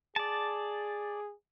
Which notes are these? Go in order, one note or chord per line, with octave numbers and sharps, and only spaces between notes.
G#4 D5 A5